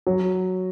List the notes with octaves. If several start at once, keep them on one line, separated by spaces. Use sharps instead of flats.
F#3